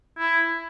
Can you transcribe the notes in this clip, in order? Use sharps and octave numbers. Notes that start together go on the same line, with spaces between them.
E4